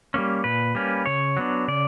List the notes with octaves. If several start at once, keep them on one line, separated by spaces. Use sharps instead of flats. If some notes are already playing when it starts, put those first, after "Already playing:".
G3 A#3 C#4
A#2 B4
G3 A#3 C#4
C#3 C#5
F#3 B3 D4
C#3 D5